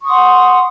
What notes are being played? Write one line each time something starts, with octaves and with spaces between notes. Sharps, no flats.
F#5 C6 C#6 D#6